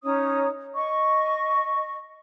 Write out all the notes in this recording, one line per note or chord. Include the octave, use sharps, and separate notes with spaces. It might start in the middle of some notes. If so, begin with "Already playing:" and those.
C#4 D#4 C#5 D#6
D#5 C#6